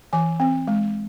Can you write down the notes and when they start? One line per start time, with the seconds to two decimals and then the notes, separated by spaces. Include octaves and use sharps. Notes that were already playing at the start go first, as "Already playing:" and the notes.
0.13 E3 G#5
0.40 C4
0.68 G#3